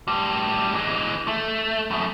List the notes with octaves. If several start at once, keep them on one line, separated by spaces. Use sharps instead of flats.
A2 G3
E3 G#3
A3
F#2 A3